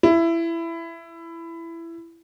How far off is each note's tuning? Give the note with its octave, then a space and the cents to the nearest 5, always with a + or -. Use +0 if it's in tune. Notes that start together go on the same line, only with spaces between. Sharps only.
E4 +15